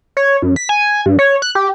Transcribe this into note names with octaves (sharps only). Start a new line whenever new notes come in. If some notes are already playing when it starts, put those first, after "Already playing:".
C#5
F#2
B6
G#5
G2
C#5
F#6
G4